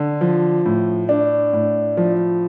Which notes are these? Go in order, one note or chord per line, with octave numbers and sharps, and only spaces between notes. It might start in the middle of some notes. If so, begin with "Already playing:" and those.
Already playing: D3
F3
A2
D4
A2
F3